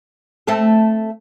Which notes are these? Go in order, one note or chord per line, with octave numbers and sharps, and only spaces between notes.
A3 C4 A4